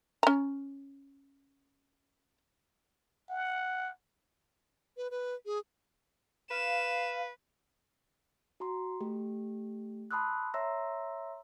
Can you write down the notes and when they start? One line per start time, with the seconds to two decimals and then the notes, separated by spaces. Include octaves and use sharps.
0.23 C#4 A#5
3.29 F#5
4.97 B4
5.11 B4
5.46 G#4
6.51 B4 F5 E7
8.60 F#4 A#5 C6
9.01 A3 G4
10.11 A5 B5 C6 D#6 E6 F#6
10.54 C#5 E5 A#5 C6 E6 A#6